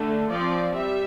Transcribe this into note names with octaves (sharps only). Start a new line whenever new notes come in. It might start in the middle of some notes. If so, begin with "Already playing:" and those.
Already playing: D3 A3
F3 C4 D5
G3 E5